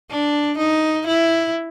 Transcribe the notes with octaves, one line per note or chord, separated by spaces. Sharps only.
D4
D#4
E4